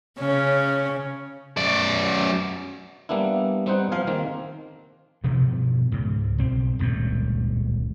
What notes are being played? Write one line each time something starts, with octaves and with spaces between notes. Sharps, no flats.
C#3 C#4
F#2 D5
G3 A#3 B3 D4 E4
G3 B3 C4 D#4 C5 F#5
F3 F5 G#5
D#3 A#3 C4
G2 B2 E3 F3
C#2 G#2
B1 C4
D#1 C#2 F#2 A2